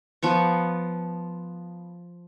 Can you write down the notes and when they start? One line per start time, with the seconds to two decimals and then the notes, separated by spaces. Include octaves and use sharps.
0.23 F3 B3 C#6